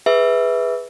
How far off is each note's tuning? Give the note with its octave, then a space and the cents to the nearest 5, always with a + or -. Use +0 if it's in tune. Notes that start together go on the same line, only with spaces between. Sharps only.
G#4 -5 B4 +0 E5 -10